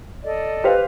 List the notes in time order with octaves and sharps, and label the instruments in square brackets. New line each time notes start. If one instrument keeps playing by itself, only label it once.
[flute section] A4 D5 D#5
[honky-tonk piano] G4 C5 F5 [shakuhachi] B4